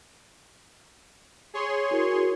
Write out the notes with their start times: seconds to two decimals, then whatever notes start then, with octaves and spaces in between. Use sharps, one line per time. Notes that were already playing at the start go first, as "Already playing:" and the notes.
1.54 G#4 C#5 C6
1.91 E4 F#4 A#4